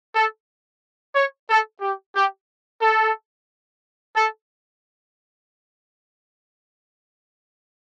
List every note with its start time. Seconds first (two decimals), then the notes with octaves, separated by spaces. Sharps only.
0.15 A4
1.16 C#5
1.49 A4
1.82 G4
2.15 G4
2.82 A4
4.16 A4